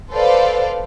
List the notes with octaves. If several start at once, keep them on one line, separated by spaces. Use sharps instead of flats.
A4 B4 C5 D5 F5